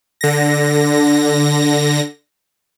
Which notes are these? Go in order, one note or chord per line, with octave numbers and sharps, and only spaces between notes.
D3 A#6